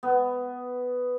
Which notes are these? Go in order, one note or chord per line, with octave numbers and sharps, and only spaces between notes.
B3